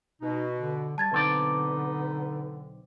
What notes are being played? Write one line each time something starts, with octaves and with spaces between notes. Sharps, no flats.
B2 D#4
D3
G3 A5 G#6 A6
B1 D3 B3 C4 D#4 D5